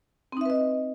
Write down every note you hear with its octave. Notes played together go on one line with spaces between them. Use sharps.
C4 D#4 B4 D#5 E5